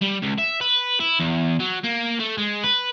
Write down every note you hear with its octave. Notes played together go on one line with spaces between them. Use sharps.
G3
C#2
E5
B4
E4
E2
F#3
A#3
A3
G#3
B4